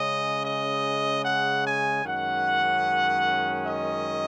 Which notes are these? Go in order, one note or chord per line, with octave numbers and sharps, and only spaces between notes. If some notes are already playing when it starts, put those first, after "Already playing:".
Already playing: C#3 G#3 C#4 D#5
D#5
F#5
G#5
F#2 D#3 G#3 C#4 F#5
D#5